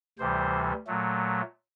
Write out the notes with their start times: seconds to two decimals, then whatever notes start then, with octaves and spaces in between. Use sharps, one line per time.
0.18 D2 C3 E3 G3 C5
0.87 A#2 F#3 A3